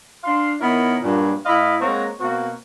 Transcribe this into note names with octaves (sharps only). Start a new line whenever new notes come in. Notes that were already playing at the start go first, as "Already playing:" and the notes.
D4 F5 C6
D#3 B3 E4 A#4 C#5 D#5
G2 A#2 F#3
A2 E4 D#5 F5 B5
G#3 A#3 C4 C#5 F#5 A#5
B2 A#3 C4 F#4